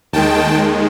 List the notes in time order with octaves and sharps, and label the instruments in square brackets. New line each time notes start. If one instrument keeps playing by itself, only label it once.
[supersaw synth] D#2 D#3 G#3 G5 A5